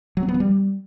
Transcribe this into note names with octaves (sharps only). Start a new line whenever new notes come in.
F#3
C4
B3
F3
G3